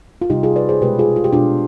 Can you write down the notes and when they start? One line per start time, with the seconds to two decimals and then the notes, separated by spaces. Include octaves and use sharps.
0.22 F4
0.30 C3 G3 D#4 G4
0.43 F4 G#4
0.56 B4 D5
0.69 G#4 C5
0.82 B2 G#3 G4 B4
0.99 F4 G#4
1.16 F4
1.24 G4
1.33 B2 G#3 D4 F4